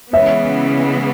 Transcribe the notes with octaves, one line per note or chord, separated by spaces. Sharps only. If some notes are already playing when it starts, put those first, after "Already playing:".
C#3 E3 G#3 B3 C#5 E5